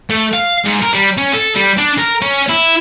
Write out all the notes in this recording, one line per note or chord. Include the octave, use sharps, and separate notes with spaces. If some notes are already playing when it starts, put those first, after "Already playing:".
A3
F5
G#2
A#4
G3
C#4
A4
G3
D4
A#4
C#4
E4